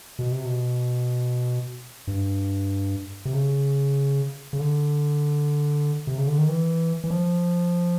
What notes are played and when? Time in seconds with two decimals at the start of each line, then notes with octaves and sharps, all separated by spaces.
0.19 B2
0.32 C3
0.45 B2
2.07 G2
3.25 C3
3.33 C#3
4.53 C#3
4.59 D3
6.07 C3
6.18 C#3
6.27 D3
6.38 D#3
6.49 E3
7.04 E3
7.10 F3